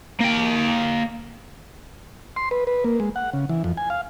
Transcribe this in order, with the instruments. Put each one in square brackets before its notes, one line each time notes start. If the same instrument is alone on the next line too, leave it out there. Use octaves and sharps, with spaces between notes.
[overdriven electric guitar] A#3 G5
[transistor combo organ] C6
B4
B4
A#3
G#3
F#5
C#3
E3
F2
G#5
F5